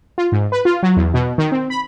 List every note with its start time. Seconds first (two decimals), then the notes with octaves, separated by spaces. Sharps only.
0.18 F4
0.32 G#2
0.52 B4
0.65 F4
0.83 F#3
0.96 E2
1.14 B2
1.38 D#3
1.52 C4
1.70 B5